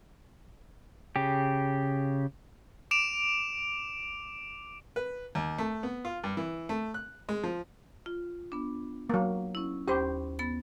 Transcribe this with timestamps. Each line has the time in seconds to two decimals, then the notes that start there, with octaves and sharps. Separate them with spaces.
1.16 C#3 G4
2.91 D6 D7 E7 F7
4.96 B4
5.35 D#2
5.58 A3
5.83 B3
6.05 F4
6.24 G2
6.37 E3
6.69 A3
6.94 F#6
7.29 G#3
7.44 F3
8.06 F4
8.52 B3 D4
9.09 F#3 A#3
9.55 C#4 E4
9.88 D#2 C#4 G4 C5 B5
10.39 B3 B5 A6